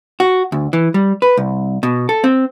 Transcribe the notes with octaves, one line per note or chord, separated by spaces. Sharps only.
F#4
D2
E3
G3
B4
C2
B2
A4
C4